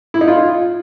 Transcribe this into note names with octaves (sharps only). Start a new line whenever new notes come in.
E4
D#4
F4